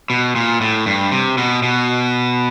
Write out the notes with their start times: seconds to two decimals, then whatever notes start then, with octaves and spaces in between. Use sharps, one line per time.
0.10 B2
0.36 A#2
0.61 A2
0.86 G2
1.12 C3
1.38 B2
1.63 B2